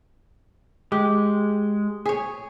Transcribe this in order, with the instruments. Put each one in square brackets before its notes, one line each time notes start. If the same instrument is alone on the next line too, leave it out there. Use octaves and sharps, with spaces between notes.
[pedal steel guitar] G#3 [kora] G4
[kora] G#4 C#5